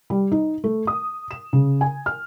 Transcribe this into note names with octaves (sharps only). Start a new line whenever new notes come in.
G3
D#4
A3
D#6
E7
C#3
G#5
F6